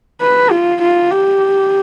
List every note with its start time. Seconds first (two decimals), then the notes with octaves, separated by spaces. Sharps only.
0.21 B4
0.51 F4
0.81 F4
1.11 G4